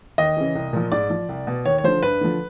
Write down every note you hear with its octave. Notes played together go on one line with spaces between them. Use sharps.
D#2 D#5
C#3 E3
C2
A#2 F3
G#2 D5
F3
C2
B2
D#2 C#5
C#5
D3 F3 C5
G2 B4
D3 F3